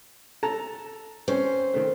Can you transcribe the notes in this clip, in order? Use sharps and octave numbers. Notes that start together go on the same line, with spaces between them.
A4 A5 A#5
C4 C#4 C5
D#3 A3